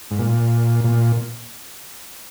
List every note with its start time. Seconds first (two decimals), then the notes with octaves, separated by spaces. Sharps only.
0.11 G#2
0.19 A#2
0.84 A#2